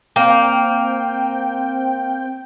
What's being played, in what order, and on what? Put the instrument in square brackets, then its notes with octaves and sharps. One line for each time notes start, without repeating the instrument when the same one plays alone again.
[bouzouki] A#3 [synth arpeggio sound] C4 G5